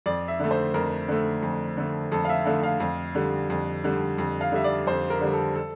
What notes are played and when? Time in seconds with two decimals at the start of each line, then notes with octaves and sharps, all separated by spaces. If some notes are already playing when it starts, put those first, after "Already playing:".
0.06 F2 D5
0.28 E5
0.40 D3 A3
0.51 C5
0.74 F2 A#4
1.08 D3 A3
1.42 F2
1.77 D3 A3
2.12 F2 A4
2.25 F5
2.29 E5
2.46 D3 A3 F5
2.63 F5
2.80 F2
3.15 D3 G3
3.50 F2
3.84 D3 G3
4.18 F2
4.41 F5
4.52 D3 G3 E5
4.64 D5
4.87 F2 C5
5.10 A#4
5.21 D3 G3
5.33 A4
5.55 A4